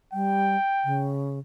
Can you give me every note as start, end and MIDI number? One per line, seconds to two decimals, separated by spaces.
0.13 0.56 55
0.13 1.12 79
0.85 1.39 49